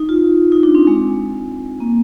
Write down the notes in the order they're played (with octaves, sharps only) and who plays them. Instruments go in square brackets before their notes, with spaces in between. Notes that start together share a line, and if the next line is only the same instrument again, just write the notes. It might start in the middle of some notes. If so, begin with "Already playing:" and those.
Already playing: [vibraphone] D#4
F4
D#4
D4
C4
G#3
A#3